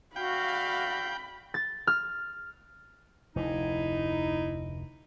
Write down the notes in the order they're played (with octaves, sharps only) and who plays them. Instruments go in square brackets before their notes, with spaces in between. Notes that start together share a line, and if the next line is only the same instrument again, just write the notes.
[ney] F#4 [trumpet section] D5 E5 F5 [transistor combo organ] G5 [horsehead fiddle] B5
[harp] A6
F6
[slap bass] F1 D2 [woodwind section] D#4 E4